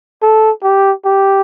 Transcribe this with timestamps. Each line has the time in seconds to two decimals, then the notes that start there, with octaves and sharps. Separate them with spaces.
0.22 A4
0.63 G4
1.06 G4